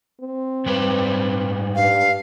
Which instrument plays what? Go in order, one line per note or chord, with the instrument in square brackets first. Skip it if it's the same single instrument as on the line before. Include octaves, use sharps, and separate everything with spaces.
[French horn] C4
[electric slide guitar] G#2 G3 B4
[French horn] G2 [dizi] F5